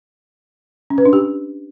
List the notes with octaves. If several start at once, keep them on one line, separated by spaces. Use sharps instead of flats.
C#4
B4
D4
G4